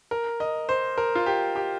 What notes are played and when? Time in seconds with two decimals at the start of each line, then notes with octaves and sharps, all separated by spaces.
0.11 A#4
0.40 D#5
0.69 C5
0.98 A#4
1.15 F4
1.26 G4
1.56 G4